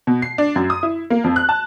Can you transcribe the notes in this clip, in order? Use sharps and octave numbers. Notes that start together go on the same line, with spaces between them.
B2
C7
D4
F#2
D#6
E4
A#3
F2
F#6
A5